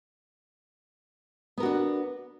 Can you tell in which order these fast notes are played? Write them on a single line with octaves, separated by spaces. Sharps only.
B3 A#4 F#4 D4